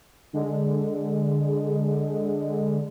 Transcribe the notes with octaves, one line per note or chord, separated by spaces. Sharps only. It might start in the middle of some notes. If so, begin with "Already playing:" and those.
D3 G#3